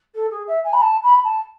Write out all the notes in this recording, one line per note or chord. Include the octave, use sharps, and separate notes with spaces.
A4
G#4
E5
G#5
B5
A5
B5
A5